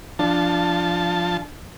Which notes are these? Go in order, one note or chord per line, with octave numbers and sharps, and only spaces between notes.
F3 D4 A5